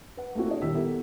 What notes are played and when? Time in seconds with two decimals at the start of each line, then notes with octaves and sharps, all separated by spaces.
0.17 B4 F#5
0.35 A3 A#3 C4 E4 F#4
0.48 D4 E4 G#4 C#5 D#5
0.62 D#1 D#3 E4 G4 E6 B6
0.74 B3 E4 G4 A4 A#4